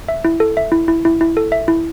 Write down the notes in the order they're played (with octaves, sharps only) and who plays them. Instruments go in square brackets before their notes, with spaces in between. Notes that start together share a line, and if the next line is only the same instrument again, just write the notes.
[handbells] E5
E4
A4
E5
E4
E4
E4
E4
A4
E5
E4